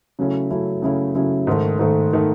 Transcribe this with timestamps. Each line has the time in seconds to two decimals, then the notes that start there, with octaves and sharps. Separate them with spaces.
0.19 C#3 F#3 A3 C#4 E4
0.51 C#3 F#3 A3 C#4 E4
0.82 C#3 F#3 A3 C#4 E4
1.15 C#3 F#3 A3 C#4 E4
1.47 G#2 D#3 A3
1.79 G#2 D#3 A3
2.13 D#3 A3